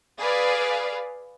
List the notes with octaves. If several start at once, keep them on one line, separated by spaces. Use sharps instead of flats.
G#4 B4 D5 F5